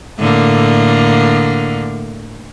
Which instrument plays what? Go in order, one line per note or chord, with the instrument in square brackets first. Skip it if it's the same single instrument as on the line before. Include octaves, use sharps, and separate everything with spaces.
[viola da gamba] A2 D3 A#3